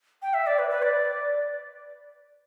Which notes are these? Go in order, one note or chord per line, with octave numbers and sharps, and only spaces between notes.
G5
E5
D5
B4
B4
D5